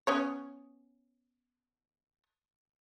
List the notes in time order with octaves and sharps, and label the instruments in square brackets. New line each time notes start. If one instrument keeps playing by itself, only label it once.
[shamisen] B3 C#4 C#5